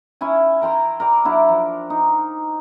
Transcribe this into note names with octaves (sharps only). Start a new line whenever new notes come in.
C#4 E4 C#5 G#5
A#4 G5 A#5 C6
A#4 D5 G5
F#3 D4 E4
F3
D#4